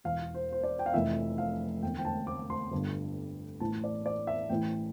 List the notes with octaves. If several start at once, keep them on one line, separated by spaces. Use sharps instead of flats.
E1 E2 B2 F5
C5
C5
D5
G5
F5
F1 F2 E3 E5
F5
E1 D2 D3 G5
G5
A5
D6
C6
G1 G2 D3
A1 A2 E3 A5
D5
D5
E5
A1 A2 E3 G5